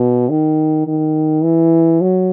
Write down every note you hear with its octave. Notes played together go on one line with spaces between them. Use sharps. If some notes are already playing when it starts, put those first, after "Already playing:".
Already playing: B2
D#3
D#3
E3
F#3